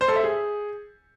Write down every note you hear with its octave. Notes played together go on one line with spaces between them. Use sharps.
C5
A4
E5
G#4